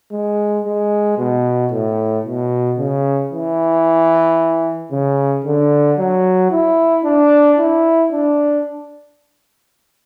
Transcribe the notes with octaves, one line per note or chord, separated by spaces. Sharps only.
G#3
G#3
B2
A2
B2
C#3
E3
C#3
D3
F#3
E4
D4
E4
D4